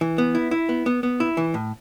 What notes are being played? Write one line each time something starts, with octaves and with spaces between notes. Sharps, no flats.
E3
B3
E4
E4
B3
B3
B3
E4
E3
A2